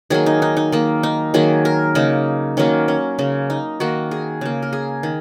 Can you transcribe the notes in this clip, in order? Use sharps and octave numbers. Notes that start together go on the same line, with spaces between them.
D#3 F#3 A#3 G#4
D#4
D#4
D#4
D#3 A#3
D#4
D#3 F#3 A#3 G#4
A#4
C#3 A#3 D#4
D#3 F#3 A#3 C#4
C#4
C#3 A#3
D#4
D#3 A#3 F#4
G#4
C#3 A#3
A#4
G#4
D#3